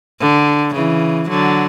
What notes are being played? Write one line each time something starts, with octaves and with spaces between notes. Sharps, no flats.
D3
C#3 E3
D3 F#3